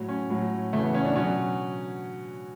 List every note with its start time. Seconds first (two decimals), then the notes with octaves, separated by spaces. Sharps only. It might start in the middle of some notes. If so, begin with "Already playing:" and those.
Already playing: A2 F#3
0.09 C#4
0.30 A2 F#3
0.73 C#3 E3 A3
0.84 B3
0.94 C#4
1.05 D4
1.16 B2 F#3 C#4